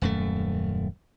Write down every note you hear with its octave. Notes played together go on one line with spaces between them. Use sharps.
D#1 F#2 A3